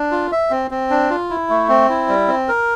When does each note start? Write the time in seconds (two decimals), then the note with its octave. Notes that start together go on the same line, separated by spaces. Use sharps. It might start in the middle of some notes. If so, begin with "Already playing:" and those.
Already playing: D4
0.11 F4
0.32 E5
0.51 C4
0.71 C4
0.90 D4
1.10 F4
1.30 E4
1.49 A3
1.69 C4
1.89 E4
2.08 G3
2.28 C4
2.49 A#4